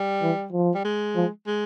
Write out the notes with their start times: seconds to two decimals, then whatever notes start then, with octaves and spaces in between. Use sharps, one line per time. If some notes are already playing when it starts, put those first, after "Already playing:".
Already playing: G3
0.22 E3
0.52 F3
0.74 G3
0.85 G#3
1.15 F3
1.47 G#3